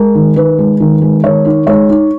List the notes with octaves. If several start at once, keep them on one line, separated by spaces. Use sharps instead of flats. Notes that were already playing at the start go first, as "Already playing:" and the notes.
Already playing: G#3 A#4
D#3
D#3 B4
G#3
D#3
G#3
D#3 C#5
D#4
G#3 C#5
D#4